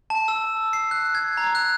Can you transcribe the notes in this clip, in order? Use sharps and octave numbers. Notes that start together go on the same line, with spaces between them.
A5
E6
C7
F#6
G#6
A#5
F#6